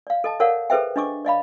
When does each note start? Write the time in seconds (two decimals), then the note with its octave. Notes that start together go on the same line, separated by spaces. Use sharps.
0.07 D5 F5
0.24 A4 D#5 A5
0.40 A4 A#4 C#5 D5 F5 F#5
0.70 G#4 A4 B4 C5 E5 G5
0.96 D4 D#5 C#6 D6
1.25 D5 D#5 F5 B5